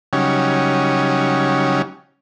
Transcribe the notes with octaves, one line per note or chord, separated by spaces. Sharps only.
C#3 F#3 G3 C#4 D#4